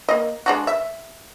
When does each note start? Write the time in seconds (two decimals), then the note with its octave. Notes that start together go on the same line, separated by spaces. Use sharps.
0.09 A#3 D#5
0.46 G#3 D4 F#4
0.67 E5